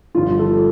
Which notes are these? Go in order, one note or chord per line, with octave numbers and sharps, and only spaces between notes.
G1 G2 D3 F3 F4
A4